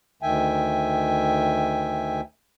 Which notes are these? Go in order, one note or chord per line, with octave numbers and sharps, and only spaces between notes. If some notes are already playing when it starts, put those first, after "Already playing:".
D2 D#3 E5 G5 G#5